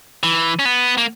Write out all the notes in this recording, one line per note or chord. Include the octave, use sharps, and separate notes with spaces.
E3
C#4
B3
A#3